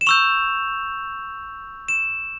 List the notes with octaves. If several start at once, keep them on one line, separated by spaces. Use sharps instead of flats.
E7
C#6 E6 G6 F7
E7